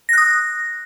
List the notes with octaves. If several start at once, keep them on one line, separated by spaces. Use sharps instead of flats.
D#6 F#6 A#6